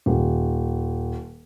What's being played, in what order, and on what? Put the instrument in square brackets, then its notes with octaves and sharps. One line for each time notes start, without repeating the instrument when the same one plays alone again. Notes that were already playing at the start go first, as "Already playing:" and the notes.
[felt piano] D#1